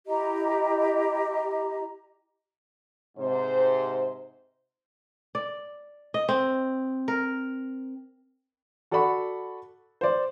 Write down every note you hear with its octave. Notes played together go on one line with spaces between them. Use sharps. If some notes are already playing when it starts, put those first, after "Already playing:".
E4 G4 D#5 A#5
G#2 C3 C5
D5
D#5
C4
A#4
F#4 A4 D5 F#5 B5 C#6
C5 D5